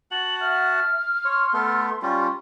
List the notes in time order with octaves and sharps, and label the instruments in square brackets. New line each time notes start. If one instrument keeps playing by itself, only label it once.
[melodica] F#4 F#5 A5 [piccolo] F#7
[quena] E5 [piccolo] F6
[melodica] C#5 [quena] C6
[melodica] A3 B3 A4
G3 C#4 F4